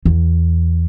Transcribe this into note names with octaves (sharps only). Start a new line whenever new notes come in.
E2